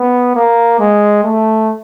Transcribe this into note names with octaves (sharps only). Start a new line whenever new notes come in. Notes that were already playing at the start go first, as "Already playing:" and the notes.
Already playing: B3
A#3
G#3
A3